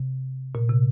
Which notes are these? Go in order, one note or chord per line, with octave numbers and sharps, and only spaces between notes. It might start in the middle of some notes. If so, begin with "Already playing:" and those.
Already playing: C3
A#2
C3